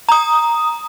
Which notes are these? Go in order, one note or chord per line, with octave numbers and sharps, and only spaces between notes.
A#5 D#6